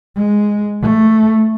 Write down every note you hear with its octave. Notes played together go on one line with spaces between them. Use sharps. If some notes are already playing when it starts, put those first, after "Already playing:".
G#3
A3